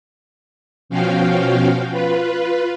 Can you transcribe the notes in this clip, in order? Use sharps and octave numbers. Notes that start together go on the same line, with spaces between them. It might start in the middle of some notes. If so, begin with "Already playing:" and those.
B2 F3 C#4 F#4 F5 G5
F4 B4